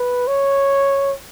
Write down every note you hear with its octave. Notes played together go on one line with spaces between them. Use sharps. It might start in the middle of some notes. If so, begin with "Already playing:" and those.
Already playing: B4
C#5